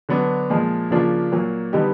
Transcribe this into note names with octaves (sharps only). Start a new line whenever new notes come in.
D3 F#3 B3 D4
A#2 F3 G#3
C#3 F3 A#3 D4 F4
A#2 F#3 A#3
D3 G3 B3 D#4 G4